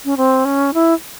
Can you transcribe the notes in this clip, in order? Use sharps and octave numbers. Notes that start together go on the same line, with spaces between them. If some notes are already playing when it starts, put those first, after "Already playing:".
C#4
C4
C#4
E4